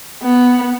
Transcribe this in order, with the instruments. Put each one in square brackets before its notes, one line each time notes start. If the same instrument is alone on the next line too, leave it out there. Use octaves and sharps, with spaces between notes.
[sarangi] B3